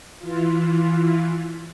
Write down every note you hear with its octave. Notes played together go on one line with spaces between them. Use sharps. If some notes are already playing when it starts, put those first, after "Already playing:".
E3 F4